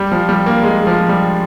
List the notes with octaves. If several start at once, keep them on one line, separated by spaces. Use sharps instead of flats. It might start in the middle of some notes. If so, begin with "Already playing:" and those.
Already playing: G3
F3
G3
A#3
G#3
F3
G3